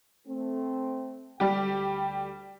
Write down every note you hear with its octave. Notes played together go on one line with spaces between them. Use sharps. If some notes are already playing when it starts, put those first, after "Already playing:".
A3 C4
D2 G3 G4 G5